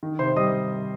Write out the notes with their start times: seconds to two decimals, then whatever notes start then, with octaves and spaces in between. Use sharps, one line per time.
0.03 D#3
0.19 C3 C5 C6
0.36 G3 D#5 D#6